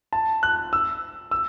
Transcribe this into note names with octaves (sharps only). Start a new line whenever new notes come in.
A5
F#6
E6
E6